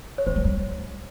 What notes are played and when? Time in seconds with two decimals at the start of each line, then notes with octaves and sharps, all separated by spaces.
0.18 C#5
0.26 C4 C5
0.36 G#3
0.45 G3